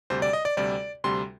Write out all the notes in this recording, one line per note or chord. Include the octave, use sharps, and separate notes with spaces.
D2 C3 G3 C5
D5
D#5
D5
D2 C3 G3 D5
D2 C3 G3 C6